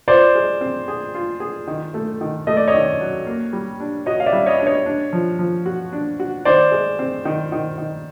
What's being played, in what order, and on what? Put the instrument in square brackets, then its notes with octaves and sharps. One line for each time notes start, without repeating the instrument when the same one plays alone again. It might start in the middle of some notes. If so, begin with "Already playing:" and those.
[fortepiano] F4 [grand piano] C5 D5
[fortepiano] G#3
C4
G#4
F4
G#4
D#3
A3
D#3
[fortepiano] A3 [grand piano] D#5
[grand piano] D5
C#5 D#5
[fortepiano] D#3
F#3
A#3
G3
D4
[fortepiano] F#4 [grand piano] C#5 D#5
[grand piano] F5
D5 E5
[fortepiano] G3
[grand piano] C#5 D#5
[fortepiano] D4
[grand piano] C#5 D#5
[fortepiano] D4
F3
F3
F#4
D4
F#4
[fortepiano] D#3 [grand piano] C5 D5
[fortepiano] G#3
C4
D#3
D#3
D#3